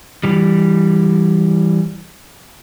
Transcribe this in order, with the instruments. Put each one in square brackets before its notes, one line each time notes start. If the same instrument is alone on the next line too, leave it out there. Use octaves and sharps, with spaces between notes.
[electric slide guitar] E3 G3